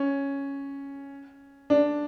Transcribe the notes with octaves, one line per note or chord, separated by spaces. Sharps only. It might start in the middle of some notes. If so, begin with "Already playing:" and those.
Already playing: C#4
D4